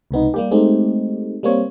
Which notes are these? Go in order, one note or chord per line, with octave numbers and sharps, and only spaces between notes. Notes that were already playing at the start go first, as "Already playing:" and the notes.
C#2 C3 B3 D#4
G3 A#3 G4
G#3 A3 C4 D#4 G4
G3 A#3 C4 C#5